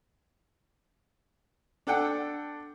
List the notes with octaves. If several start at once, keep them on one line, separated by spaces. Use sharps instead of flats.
D4 A4 F#5 G5